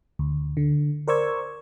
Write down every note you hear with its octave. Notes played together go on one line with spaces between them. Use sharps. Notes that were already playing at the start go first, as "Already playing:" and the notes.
D2
D3
A#4 C5 D5 C#6 E6 G#6